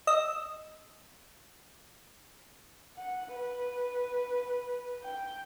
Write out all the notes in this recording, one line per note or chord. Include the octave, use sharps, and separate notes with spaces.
D#5 E6
F#5
B4
G5